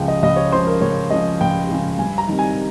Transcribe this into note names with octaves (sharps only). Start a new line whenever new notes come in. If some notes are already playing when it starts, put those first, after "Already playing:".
Already playing: C#2 C#3 F3 G#3 G5
D#5
C#2 D#5
C#5
C#3 F3 G#3 C5
A#4
C#2 C#5
C#3 F3 G#3 D#5
C#2 G5
C#3 F3 G#3
G2 G#5
A#5
D#3 G3 C4
G#5